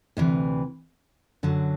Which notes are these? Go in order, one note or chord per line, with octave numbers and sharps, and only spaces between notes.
D2 C3 E3
F#2 D3 F#3